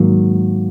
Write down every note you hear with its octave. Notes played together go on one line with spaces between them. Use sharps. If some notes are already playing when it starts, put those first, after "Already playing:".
Already playing: G#2 D#3 F#3 A#3